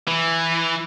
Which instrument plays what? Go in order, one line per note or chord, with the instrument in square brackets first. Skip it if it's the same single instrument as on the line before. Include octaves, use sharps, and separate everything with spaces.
[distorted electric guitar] E3